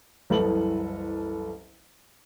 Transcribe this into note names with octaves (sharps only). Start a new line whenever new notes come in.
F#1 C2 E3 A4 B4 F#7